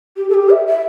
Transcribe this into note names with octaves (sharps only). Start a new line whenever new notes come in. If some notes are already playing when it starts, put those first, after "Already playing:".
G4
A4
G4
E5
E5